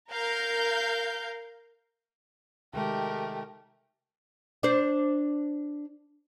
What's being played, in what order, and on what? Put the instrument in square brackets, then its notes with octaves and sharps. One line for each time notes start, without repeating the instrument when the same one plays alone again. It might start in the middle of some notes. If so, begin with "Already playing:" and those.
[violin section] A#4 F5 G6
[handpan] C3 D#3 G#3 [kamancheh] A3 [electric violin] G4 A#4 [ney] G5
[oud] D4 C5